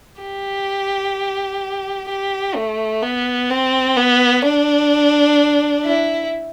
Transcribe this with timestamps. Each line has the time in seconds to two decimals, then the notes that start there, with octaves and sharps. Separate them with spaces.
0.21 G4
2.09 G4
2.55 A3
3.02 B3
3.50 C4
3.96 B3
4.43 D4
5.84 E4